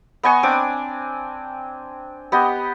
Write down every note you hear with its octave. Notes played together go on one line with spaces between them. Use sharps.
B3 D#5 G#5 C#6
C4 D4 D6
B3 G4 D#5